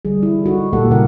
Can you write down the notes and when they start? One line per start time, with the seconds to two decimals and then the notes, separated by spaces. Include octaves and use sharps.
0.05 D3 G3 G#4
0.23 E4
0.44 D#4 F#4 A4
0.73 A#2 A#3 G4 A4 F#5
0.91 C#3 G3 E4 A#4 F#5